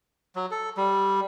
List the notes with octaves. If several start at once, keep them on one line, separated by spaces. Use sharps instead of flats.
F#3
A4
G3